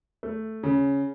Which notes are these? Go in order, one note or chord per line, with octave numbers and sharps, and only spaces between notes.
A3
C#3